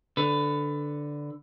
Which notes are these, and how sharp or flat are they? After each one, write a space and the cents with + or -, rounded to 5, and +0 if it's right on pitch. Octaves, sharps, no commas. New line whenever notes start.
D3 +0 B4 +20